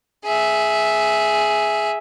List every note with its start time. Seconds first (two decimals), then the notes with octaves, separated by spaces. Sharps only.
0.25 G#4 E5